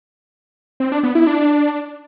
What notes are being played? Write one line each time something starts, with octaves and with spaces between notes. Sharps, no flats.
C4
D4
B3
E4
D4